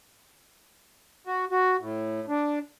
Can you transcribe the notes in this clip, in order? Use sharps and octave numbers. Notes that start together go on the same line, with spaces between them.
F#4
F#4
A2
D4